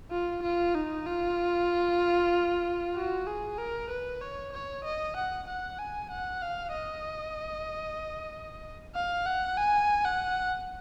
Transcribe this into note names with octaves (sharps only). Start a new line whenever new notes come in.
F4
F4
D#4
F4
F#4
G#4
A#4
B4
C#5
C#5
D#5
F#5
F#5
G#5
F#5
F5
D#5
F5
F#5
G#5
F#5